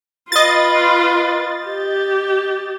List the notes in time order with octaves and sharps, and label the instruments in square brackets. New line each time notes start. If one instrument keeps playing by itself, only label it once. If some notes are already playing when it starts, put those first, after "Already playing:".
[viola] F4 B4 [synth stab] D#5 A6
[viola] G4